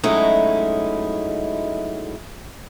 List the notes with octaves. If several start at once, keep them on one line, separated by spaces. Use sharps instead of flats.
F#3 G#3 A3 C#4 D#4 E4